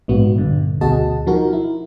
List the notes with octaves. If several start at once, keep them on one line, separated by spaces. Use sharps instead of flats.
A#1 G#2 B3 F#4
A#1 G2 D3
D2 B2 F#4 G#4 D#5 A5
F3 D#4 F#4 A#4
E4